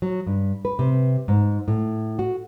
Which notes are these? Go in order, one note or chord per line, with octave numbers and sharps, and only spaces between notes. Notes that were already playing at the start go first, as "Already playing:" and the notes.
F#3
G2
B4
C3
G#2
A2
F#4